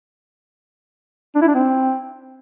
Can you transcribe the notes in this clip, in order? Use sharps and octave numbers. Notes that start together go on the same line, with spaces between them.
D4
E4
D4
C4